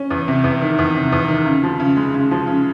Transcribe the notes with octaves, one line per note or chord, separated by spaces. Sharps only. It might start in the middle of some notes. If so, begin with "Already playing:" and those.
Already playing: C#4
E2
C3
E2
D#3
E2
C3
E2
D#3
C#3
F3
C#3
G#3
C#3
F3
C#3